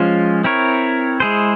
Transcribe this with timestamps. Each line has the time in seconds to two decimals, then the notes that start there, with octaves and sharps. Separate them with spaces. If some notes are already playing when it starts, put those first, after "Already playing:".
Already playing: F3 G#3 C#4 F4 C5
0.44 C4 E4 A#4 C#5
1.20 G#3 E4 G#4 C5